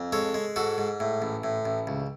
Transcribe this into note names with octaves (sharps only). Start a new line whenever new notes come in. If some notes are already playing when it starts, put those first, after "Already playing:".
Already playing: F2
G#3 A4 C#5
G#3
G#2 F#4 A4
G#2
A2
A1
A2
A1
C#2